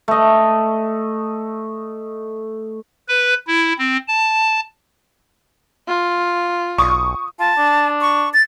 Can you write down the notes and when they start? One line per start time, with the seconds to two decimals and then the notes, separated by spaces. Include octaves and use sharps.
0.08 A3 D#5
3.09 B4
3.47 E4
3.79 C4
4.08 A5
5.88 F4
6.78 B1 C#6 D#6
7.39 F4 A5
7.57 D4
8.01 C#6
8.34 A6